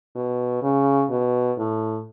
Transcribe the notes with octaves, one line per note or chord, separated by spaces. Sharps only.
B2
C#3
B2
A2